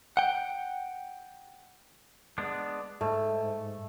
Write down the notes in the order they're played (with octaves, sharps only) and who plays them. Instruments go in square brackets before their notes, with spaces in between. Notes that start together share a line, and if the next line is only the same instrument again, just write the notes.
[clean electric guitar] F#5 G5
[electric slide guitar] G#3 B3 D4
[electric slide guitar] G#2 [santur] A3